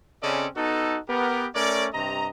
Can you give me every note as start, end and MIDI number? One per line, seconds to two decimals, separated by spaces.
0.22 0.47 49
0.22 0.47 60
0.22 0.47 61
0.22 0.47 69
0.22 0.47 74
0.22 0.47 75
0.56 0.98 59
0.56 0.98 63
0.56 0.98 66
0.56 0.98 69
1.09 1.47 59
1.09 1.47 67
1.09 1.47 70
1.54 1.87 57
1.54 1.87 61
1.54 1.87 70
1.54 1.87 73
1.54 1.87 74
1.94 2.27 43
1.94 2.27 48
1.94 2.27 75
1.94 2.27 82